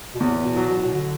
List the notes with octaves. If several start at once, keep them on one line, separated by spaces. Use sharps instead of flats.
B2
E2 A2
B2
F#3
B2
A2
B2
D3